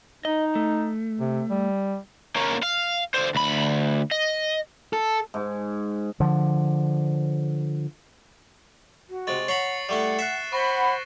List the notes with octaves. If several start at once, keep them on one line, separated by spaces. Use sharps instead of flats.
D#4 D#5
A3
C3
G3
A#3 C#4
F5
D3 C5
D2 B5
D#5
A4
G#2
D3 F3
F#4
C3 G#3 C#6 A6 F#7
C#5 F#5 A#5 B5 C7 C#7
G3 A3 E4 F#5
E5 F#6 C7 E7
C5 F#5 B5 C#6 A#6 G7